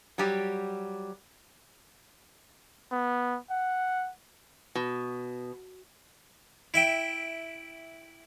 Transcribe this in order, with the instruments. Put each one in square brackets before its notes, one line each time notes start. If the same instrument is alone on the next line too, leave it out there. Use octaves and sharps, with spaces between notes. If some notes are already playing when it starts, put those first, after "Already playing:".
[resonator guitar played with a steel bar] F#3 G3 G4
[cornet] B3
F#5
[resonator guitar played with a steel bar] B2
[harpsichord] E4 E5 G5